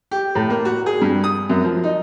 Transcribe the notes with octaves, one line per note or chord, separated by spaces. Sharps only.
G4
A2
A#3
F#4
G#4
G2
D#6
F#2
F3
D#4